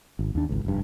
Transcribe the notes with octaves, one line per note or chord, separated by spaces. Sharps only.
G#1
D#2 D4
G#1 C#2
F1 G2